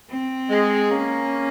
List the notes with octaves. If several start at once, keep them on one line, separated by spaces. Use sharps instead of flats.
C4
G#3
A#3 C#4